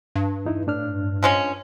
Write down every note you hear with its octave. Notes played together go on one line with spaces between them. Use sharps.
G2
E2 D#4 E4
A2 D4 F6
F3 G#3 C#4